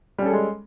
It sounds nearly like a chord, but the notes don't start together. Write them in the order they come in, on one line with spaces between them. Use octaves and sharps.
G3 C#4 A4 G#4 G#3